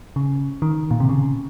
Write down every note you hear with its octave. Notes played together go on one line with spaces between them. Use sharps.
C#3
D#3
A#2
C3
C#3